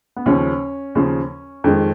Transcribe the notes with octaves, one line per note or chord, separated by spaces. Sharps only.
B3
D#2 C#3 F3 C#4
D#2 C#3 F3
F2 D#3 G#3